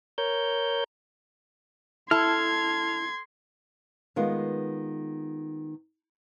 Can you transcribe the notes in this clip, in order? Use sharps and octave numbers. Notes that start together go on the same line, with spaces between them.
A#4 C#5 G6
E4 A4 C6 F6 G#6
D#3 G#3 B3 F4